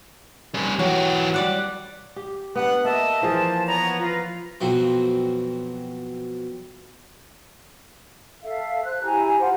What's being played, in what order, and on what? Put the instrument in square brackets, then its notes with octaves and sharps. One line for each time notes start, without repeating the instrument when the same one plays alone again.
[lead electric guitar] G3 C#4
[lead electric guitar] E3 G4 [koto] F#3
[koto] G3 D5 F#5
[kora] G4
[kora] B3 [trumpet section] D4 F#5
[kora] A#3 [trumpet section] D#5 E5 [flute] A5
[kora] E3 F3 G#4 [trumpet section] A#3 F4 C5
[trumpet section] B3 C#5 [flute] A#5
[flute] F4 [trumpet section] B4 A#5
[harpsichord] F2 B2 F#3 C4
[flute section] A4 E5 F5
C5 F#6
E4 G4 G#5 A#5
F4 G4 C5 F#5